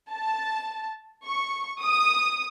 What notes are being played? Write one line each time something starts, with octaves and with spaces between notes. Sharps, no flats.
A5
C#6
D#6